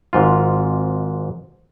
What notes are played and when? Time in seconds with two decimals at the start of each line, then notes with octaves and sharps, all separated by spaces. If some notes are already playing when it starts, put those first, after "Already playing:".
0.13 G#1 G#2 F4